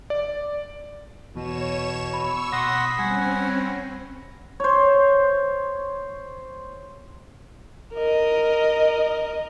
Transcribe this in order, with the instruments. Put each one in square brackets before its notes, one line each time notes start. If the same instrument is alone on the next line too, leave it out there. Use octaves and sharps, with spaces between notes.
[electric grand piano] D5
[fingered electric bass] E2 [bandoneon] B2 [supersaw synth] C#5 E7
[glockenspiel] B5 [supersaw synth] C#6 E6
[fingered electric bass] B2 [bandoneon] F#5 C6 D#6 [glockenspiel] A#6 [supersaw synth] B6
[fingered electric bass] G3 [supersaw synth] C4 C#4 [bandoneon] F#5 G#5
[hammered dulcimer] C5 C#5
[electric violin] A#4 D#5